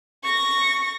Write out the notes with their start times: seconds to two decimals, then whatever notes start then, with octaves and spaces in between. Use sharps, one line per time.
0.24 C#6 A#6